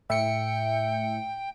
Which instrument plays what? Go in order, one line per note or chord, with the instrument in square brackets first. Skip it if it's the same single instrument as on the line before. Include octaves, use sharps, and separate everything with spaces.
[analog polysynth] A2 [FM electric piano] E5 C#7 [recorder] G5